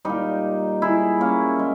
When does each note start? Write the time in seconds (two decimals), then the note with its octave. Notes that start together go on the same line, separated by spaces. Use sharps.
0.05 A#2 G3 D#4 G4
0.82 E4 G#4
1.20 A#3 C#4
1.59 G#3